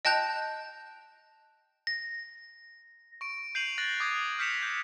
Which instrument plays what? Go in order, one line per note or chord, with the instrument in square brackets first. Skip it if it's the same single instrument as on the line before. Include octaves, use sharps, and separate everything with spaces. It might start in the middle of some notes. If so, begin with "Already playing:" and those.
[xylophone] D#5 G5 A5 F#6 G6 F7
[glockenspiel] A#6
[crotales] C#6 D7
G6 C7 D#7 F7 F#7
F#6 A6 A#6 F#7
D6 D#6 F#6 G#6
F6 G6 B6 C#7 E7 F7
G6